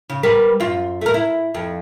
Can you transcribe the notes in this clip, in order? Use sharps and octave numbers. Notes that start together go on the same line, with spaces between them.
C#3
G3 A#4 B4
F#2 F4
A3 A#4
E4
F2